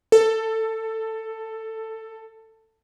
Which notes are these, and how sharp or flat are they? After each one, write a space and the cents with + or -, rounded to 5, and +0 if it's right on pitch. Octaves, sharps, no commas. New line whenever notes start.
A4 +15